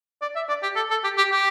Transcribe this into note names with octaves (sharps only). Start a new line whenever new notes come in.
D5
E5
D5
G4
A4
A4
G4
G4
G4